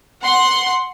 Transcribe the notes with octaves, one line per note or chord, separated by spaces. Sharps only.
F#5 C6